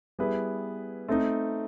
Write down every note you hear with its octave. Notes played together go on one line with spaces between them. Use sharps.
G3 B3 E4 G#4 B4
A3 C4 D#4